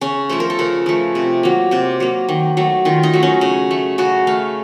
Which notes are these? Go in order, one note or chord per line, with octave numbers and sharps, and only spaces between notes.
C#3 C#4
F3 A3 C5
A#4
A4
C#3 A#4
F3 A3
C3
F#3 A#3
C3 C5
F#3 A#3
D#3
F#3 A3
D#3 F4
D#4
F#3 A3
C#4
C#3
A3
C#3 F#4
A3 F5